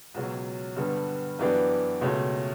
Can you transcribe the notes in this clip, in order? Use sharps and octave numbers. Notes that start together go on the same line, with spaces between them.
C#2 B2 F#3 C#4
G2 D3 G3 B3
F#2 E3 B3 D4 G4
C#2 B2 A3 C#4